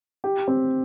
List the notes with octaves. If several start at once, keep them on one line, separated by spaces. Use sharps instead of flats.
G4
C4